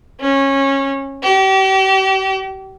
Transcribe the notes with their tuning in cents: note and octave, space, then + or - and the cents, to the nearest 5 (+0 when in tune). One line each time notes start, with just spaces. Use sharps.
C#4 -20
G4 -35